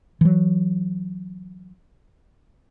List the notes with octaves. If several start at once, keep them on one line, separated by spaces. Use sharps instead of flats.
E3 F#3